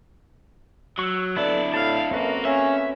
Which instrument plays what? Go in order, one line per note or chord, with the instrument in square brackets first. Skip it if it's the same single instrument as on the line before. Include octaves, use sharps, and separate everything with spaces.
[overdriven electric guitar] F#3 [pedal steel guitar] C#6 E6
[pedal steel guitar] B3 A4 [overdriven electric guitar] D4 E4 [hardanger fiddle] D5
[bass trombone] A2 [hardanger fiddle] F5 [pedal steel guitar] A5 B5 F6
[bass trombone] F#2 [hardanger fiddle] A#3 F#4 [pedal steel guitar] C4 A4 B4
[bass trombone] C#4 [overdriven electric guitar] E5